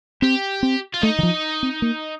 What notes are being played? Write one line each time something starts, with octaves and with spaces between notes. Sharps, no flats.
C4 G4
C4
F4
A3 D#4
D#3
F3
C4
A#3